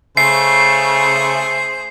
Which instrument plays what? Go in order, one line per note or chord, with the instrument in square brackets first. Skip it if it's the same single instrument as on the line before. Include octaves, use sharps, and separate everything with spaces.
[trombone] C#3 [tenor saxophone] A3 [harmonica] G#4 C5 [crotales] C7